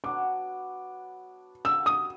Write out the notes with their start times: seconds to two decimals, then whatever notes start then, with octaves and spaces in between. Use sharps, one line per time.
0.04 F#3 B3 D4 D6
1.65 G3 A#3 D4 F#4 E6
1.86 D#6